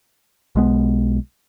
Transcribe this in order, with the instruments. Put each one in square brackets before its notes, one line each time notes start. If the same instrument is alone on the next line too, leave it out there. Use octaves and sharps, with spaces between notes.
[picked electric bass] B1 G#3 B3